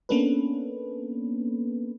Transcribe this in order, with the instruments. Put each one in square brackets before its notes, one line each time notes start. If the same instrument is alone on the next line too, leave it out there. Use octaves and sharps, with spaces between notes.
[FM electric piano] A#3 B3 C#4 D4 A4 B4